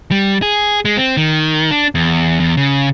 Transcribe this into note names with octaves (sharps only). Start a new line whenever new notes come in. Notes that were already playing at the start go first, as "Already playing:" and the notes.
G3
G#4
G#3
C4
D#3
D4
E2
E2
C#3